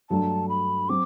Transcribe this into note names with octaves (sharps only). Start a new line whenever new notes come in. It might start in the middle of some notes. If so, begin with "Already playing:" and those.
G2 F#3 A3 D4 A5
B5
F#3 C4 F#4 D6